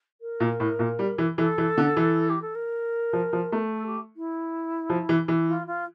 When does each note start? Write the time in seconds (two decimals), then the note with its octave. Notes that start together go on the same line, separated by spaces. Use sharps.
0.21 A#4
0.40 A#2
0.60 A2
0.79 A#2
0.99 G3
1.18 E3
1.38 E3 A4
1.58 E3
1.78 D3
1.97 E3
2.29 G4
2.42 A4
2.55 A#4
3.13 F3
3.33 F3
3.52 A3
3.72 A4
3.86 G4
4.16 E4
4.90 F3
5.09 E3
5.28 E3
5.48 F4
5.67 F4